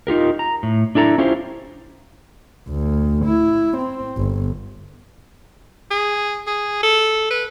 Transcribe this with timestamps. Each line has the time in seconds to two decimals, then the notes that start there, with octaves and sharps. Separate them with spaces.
0.07 D#4 F4 G4 A#4
0.39 A#5
0.63 A2
0.95 D4 E4 A4 A#5
1.18 C#4 E4 F4 G4 C5
2.69 D2
3.25 E4
3.77 C4
4.17 G1
5.91 G#4
6.47 G#4
6.83 A4
7.31 B4